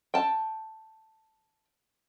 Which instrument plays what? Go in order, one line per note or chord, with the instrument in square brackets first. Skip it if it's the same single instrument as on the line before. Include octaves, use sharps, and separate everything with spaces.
[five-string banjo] G5 A5